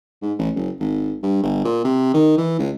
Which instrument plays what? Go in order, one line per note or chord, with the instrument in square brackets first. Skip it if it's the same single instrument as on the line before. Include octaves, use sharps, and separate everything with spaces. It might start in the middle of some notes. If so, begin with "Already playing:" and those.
[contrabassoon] G#2
A1
F#1
G#1
G2
G1
A#2
C3
D#3
E3
C#2